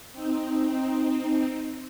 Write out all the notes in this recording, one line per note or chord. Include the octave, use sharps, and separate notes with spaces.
C4 D#4